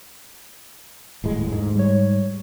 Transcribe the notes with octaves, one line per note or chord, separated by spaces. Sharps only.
D#1 A2 G#3
G#2
G3 C#5